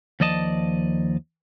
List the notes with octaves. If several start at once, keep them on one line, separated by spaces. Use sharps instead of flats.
D#2 F3 D5 D#5 A5